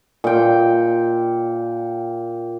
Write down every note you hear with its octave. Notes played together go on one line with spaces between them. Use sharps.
A#2 G5